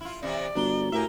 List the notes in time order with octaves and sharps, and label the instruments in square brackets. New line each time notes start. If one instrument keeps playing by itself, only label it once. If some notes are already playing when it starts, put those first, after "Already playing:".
[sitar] E4 F4
[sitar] C3 E3 E4 [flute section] D5
[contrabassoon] G1 [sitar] D4 [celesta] F#4 A#5 G7
[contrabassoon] A2 [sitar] A#3 G4 E5 [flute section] A#4 G#5